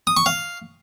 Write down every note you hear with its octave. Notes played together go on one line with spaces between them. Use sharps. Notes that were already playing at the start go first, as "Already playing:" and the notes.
D#6
C#6
F5